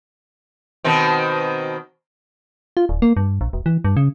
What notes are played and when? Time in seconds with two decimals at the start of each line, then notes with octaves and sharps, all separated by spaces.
0.85 B2 D#3 C4
2.77 F4
2.89 D1
3.02 A#3
3.17 G2
3.41 A#1
3.53 E1
3.66 E3
3.85 G2
3.97 C#3